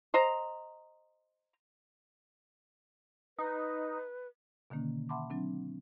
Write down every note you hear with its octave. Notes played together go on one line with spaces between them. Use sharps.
C5 D#5 A#5
D#4 B4
B2 D3 D#3 A#3 C#4
E5 F#5 A5 B5 C6 D6
F#3 C4 D4